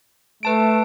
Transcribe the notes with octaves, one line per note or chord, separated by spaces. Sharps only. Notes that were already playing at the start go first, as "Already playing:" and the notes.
A3 B4 A5 D7